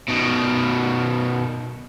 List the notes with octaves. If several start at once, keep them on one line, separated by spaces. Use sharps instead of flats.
B2 D#3